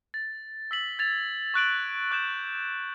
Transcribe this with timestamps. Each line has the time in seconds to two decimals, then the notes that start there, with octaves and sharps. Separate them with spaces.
0.14 A6
0.71 E6 B6 F#7
0.99 G#6 A6 F7
1.54 C#6 F#6 D7 F#7
2.11 D6 F#6 G6 E7